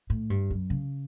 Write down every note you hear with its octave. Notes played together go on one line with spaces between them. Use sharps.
A2
G2
F#2
C#3